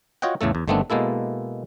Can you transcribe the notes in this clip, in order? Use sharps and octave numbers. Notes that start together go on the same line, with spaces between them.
F4 F#4 C#5 D#5 F#5 G5
E2 A2 C#3 A3 A4
E2
G1 D#3 A3 B3 C4 D4
B2 G#3 A#3 E4 A4